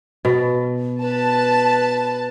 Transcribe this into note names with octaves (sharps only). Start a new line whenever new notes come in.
B2
B4 A5